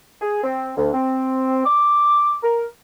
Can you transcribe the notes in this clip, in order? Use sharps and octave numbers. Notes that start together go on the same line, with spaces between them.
G#4
C4
D2
C4
D6
A#4